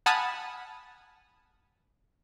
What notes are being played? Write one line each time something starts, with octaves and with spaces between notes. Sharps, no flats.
F#5 G#5 A5 B5 D#6 F6